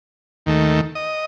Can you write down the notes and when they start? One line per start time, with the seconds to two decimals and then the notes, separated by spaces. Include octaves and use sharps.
0.46 D#2 D#3 A3
0.95 D#5